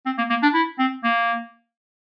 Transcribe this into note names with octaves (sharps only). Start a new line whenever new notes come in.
C4
A#3
A#3
D4
E4
C4
A#3